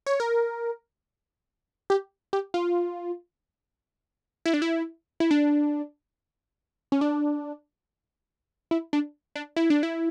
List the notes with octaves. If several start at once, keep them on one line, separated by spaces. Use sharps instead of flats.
C#5
A#4
G4
G4
F4
E4
D4
E4
E4
D4
C#4
D4
E4
D4
D4
E4
D4
E4